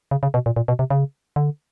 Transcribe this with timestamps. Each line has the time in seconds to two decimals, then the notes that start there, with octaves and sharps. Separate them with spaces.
0.11 C#3
0.23 C#3
0.34 B2
0.46 A#2
0.56 A#2
0.68 B2
0.79 C3
0.90 C#3
1.36 D3